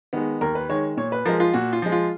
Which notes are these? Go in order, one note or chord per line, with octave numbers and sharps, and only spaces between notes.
D#3 G#3 B3
D#2 A#4
B4
D#3 G#3 C#5
A#2 C#5
B4
F3 G#3 A#4
F4
A#2 F#4
F4
F3 G#3
F4